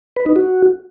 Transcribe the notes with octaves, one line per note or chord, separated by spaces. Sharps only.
B4
D#4
F#4